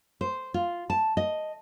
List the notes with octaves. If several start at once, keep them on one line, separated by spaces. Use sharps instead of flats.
C5
F4
A5
D#5